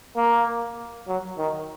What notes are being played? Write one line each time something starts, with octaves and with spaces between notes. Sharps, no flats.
A#3
F#3
D#3